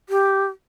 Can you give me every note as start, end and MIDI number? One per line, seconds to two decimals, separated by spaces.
0.09 0.45 67